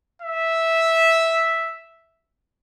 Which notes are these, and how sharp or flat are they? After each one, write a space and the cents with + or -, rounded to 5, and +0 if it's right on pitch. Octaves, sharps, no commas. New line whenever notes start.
E5 -5